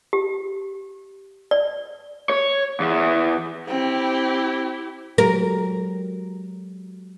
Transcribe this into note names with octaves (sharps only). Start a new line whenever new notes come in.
G4
D5
C#5
E2
C4 E4 G4
F#3 G#3 G4 A#4